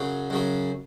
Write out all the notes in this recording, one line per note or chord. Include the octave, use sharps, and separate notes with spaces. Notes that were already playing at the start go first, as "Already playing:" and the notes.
Already playing: F#2 C#3 F#3
F#2 C#3 F#3